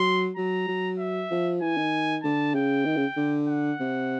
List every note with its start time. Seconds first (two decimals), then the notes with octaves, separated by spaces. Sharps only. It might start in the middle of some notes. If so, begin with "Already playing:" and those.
Already playing: F#3 C6
0.37 F#3 A#5
0.68 F#3
0.99 E5
1.31 F3
1.61 E3 G#5
1.77 D#3
2.23 D3 A5
2.55 C#3 G5
2.85 D#3
2.96 C#3
3.17 D3
3.47 F#5
3.80 C3